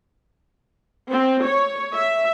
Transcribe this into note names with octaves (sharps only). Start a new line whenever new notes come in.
C4
C#5
E5